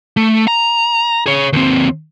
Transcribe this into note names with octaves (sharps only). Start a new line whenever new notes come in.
A3
A#5
G#4 C#5
D#2 C4